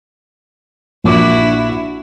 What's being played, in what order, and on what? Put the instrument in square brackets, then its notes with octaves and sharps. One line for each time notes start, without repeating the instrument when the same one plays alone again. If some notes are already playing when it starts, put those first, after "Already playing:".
[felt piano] A#1 D6 [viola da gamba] D4 E4 F#4